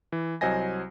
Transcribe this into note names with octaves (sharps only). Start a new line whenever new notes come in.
E3
C2 F#3 C5 D#5 G#5 A#6